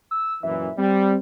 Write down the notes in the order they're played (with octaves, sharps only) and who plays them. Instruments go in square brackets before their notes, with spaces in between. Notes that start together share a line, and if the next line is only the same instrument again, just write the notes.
[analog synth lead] E6
[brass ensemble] F#2 A#2 E3 [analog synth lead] E5
[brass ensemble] G3 [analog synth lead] C4